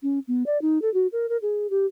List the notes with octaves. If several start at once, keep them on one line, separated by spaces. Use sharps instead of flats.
C#4
B3
D5
D#4
A4
F#4
A#4
A#4
G#4
G4